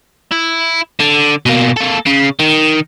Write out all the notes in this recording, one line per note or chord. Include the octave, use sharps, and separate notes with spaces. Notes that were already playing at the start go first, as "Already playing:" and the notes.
E4
D3
B2 A#3
A#3 A4
C#3
D#3